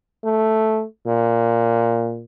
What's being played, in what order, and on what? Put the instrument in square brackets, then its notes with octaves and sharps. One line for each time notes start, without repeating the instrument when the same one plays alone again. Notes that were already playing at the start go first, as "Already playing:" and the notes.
[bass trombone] A3
A#2